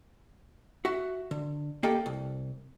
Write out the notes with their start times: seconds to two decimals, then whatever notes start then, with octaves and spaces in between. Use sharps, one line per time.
0.85 F#4 E5
1.31 D3
1.83 A#3 G4 A4 D#5 G5
2.06 C2